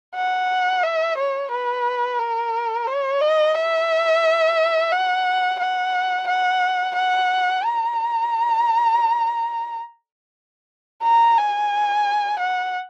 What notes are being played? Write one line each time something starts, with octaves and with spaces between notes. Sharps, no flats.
F#5
E5
C#5
B4
A#4
C#5
D#5
E5
F#5
F#5
F#5
F#5
A#5
A#5
G#5
F#5